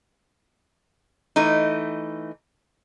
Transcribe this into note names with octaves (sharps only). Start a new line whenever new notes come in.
E3 A3 D#4